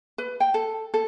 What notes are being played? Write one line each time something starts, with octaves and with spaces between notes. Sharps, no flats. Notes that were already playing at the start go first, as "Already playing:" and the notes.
B4
G5
A4
A4